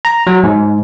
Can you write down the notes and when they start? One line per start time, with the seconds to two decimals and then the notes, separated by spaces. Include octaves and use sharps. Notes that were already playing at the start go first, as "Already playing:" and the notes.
0.05 A#5
0.27 F#3
0.43 G#2